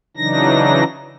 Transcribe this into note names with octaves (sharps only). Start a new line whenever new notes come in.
C#3 E3 F#3 D4 D#4 A#6